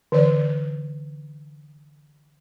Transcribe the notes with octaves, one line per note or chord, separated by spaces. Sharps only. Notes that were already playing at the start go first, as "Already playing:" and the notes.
D3 E3 D5